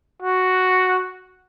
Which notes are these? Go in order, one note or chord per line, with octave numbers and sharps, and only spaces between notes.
F#4